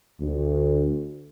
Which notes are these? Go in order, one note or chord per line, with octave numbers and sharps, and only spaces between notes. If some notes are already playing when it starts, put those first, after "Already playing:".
D2